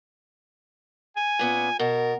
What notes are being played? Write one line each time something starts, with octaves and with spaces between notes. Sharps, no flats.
G#5
A#2 B3 C#4
B2 A#4